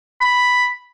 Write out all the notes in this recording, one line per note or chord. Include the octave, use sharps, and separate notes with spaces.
B5